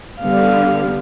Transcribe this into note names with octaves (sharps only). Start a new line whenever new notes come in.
D3 G3 B3 F5